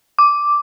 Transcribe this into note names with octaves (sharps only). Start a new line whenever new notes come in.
D6